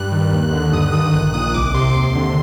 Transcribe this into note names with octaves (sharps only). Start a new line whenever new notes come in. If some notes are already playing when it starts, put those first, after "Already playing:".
Already playing: G2 G3 F#6
D#3
D#2
D3
G2 D#6
F#6
D#3 D#6
A#1 F#6
A#2 D#6
C2 D6
C3 C6
D#2
D3